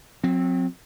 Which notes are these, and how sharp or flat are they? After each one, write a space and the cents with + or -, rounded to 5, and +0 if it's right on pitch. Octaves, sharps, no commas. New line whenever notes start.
F#3 -40 C4 +0